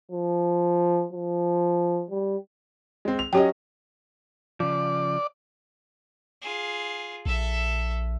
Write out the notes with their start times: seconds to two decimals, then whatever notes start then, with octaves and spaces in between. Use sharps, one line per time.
0.11 F3
1.13 F3
2.11 G3
3.05 G#3 C4
3.19 F7
3.33 F#3 C#4 G4 D#5 G5
4.60 C#3 F3 D5
6.42 F4 G#4
7.26 A#1 A4 E5